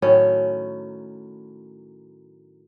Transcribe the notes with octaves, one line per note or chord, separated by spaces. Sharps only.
A2 D#3 F#3 C#4